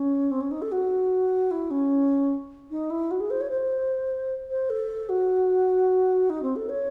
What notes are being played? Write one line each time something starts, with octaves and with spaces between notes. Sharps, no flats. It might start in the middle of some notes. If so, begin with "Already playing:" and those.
Already playing: C#4
C4
C#4
D#4
A4
F#4
E4
C#4
D#4
E4
F#4
G#4
C5
C#5
C5
C5
A4
F#4
D#4
C4
A4
C#5